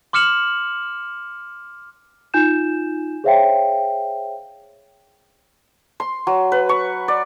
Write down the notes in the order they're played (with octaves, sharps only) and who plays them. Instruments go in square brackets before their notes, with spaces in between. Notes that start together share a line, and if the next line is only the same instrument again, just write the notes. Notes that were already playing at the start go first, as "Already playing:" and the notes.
[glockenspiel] C6 D6 F6 C#7 E7 F#7
[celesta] D#4 F4 G#5 G6 E7
G#4 C5 C#5 E5 F5 G5
[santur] C6
F#3
B4
C#6
D5